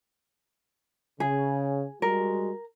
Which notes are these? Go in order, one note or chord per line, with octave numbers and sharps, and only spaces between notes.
C#3 G#4
G3 G#3 F#4 A#4